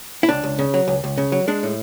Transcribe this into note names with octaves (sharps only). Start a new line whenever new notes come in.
E4
C#2 D4
C#2
C#3
F#3
C#2
C#2
C#3
F#3
G#3 D4
A2